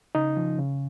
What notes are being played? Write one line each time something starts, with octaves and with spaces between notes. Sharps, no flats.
C#3 D#4
F3
C#3